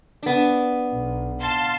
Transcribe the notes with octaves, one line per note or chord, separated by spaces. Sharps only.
B3 D4
B1
F5 A5 C6